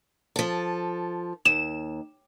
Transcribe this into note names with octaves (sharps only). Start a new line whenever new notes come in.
F3 A4
D#2 E7